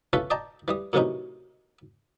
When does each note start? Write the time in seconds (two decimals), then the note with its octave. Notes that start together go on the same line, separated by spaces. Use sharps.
0.13 E3 C#4 F4 A4 B4 C#5
0.30 D5 D#5 G5 A5 A#5
0.68 E3 G3 D#6
0.93 F#2 A2 C3 E3 C#4 D#4